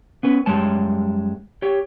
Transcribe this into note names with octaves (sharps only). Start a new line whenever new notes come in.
B3 C#4 B4
F#2 G3 G#3 C#5 A5
G4 C#5